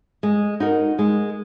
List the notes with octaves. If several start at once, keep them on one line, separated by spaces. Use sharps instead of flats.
G#3
D#4 F#4 A#4
G#3